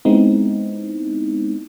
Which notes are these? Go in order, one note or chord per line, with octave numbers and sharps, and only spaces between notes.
G#3 B3 C4 D#4 E4